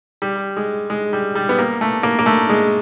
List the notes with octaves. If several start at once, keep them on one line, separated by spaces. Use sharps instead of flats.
G3
G#3
G#3
G3
G3
B3
A#3
A3
A#3
A#3
A3
G#3